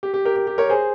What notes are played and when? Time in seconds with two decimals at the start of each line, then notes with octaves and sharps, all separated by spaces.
0.03 G4
0.14 G4
0.25 G4 A#4
0.36 G4
0.47 G4
0.58 A#4 C#5
0.69 G#4 C5